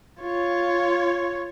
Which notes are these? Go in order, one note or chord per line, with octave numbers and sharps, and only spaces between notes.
F4 C#5